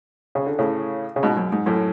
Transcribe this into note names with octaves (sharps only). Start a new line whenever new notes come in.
C#3
D3
A2 C#3
C#3
G#2 B2
F#2
G#2
F#2 A2